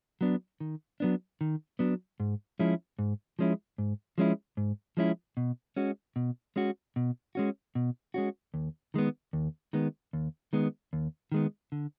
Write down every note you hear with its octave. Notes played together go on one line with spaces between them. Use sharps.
F#3 B3 D4
D#3
F#3 B3 D4
D#3
F#3 B3 D4
G#2
F3 G#3 C#4 E4
G#2
F3 G#3 C#4 E4
G#2
F3 G#3 C#4 E4
G#2
F3 G#3 C#4 E4
B2
G#3 C#4 F#4
B2
G#3 C#4 F#4
B2
G#3 C#4 F#4
B2
G#3 C#4 F#4
D#2
D#3 G#3 B3
D#2
D#3 G#3 B3
D#2
D#3 G#3 B3
D#2
D#3 G#3 B3
D3